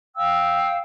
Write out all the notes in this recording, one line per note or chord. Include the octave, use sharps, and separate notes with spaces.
F5 G5 E6